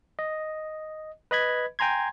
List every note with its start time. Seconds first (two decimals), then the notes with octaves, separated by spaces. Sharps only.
0.19 D#5
1.31 B4 D#5 B5 G#6
1.79 G5 G#5 A#5 C6 G#6